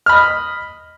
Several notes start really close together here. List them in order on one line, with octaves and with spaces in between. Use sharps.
F6 B5 D#5